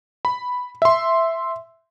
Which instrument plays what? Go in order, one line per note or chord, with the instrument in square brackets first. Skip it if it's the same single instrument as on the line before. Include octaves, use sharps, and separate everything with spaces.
[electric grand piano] B5
E5 C6